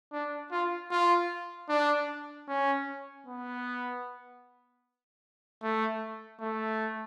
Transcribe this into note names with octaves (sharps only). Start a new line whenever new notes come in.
D4
F4
F4
D4
C#4
B3
A3
A3